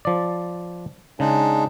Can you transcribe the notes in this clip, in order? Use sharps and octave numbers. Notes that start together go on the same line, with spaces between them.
F3 D5
C#3 G#3 D4 D#4